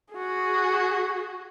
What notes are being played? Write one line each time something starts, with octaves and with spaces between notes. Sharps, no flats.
F#4 G#4